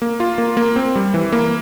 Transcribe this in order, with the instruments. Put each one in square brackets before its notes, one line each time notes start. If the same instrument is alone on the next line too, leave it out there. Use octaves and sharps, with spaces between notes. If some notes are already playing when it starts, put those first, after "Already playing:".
[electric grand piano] A#3
F4
A#3
A#3
C4
G3
E3
A#3